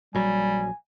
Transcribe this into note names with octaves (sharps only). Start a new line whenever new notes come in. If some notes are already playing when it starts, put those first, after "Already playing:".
A#1 F#3 G3 G#5